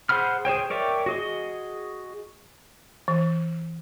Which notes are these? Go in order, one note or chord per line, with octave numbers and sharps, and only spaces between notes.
G#4 C5 F#5 B5 F6
G#4 C5 C#5 G5
A#4 C#5 D5 E5 G5
F#4 G#4 D#5
E3